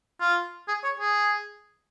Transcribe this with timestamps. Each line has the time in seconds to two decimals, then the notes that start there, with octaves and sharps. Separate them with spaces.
0.21 F4
0.68 G#4
0.84 C#5
0.99 G#4